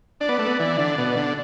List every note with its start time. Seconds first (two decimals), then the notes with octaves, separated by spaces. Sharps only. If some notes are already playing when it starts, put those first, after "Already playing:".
0.21 D4 D5
0.29 B3
0.39 A3
0.46 B3
0.59 E3 D5
0.78 D3
0.98 B2
1.16 D3